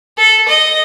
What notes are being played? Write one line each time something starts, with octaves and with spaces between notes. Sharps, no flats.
A4
D#5